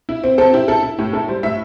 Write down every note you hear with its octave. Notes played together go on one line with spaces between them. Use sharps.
E4
C4
C4 A4
E4 G4
E4 A4
E4
A2 G4
E4 A4
G3 C5
A2 E5